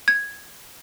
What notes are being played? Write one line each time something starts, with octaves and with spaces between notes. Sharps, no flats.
G#6